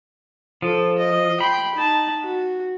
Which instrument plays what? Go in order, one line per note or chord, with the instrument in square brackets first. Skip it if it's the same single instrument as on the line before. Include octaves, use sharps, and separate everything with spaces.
[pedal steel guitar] F3 [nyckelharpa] A4
[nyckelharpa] D#5
[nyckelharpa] G5 C6 [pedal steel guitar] B5
[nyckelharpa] D#4 A5
F#4